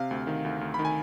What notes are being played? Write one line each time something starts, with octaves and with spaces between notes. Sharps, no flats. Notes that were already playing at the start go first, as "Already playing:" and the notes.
Already playing: C3 F5
D2
D#3
D2
D2
D#3 B5
G#5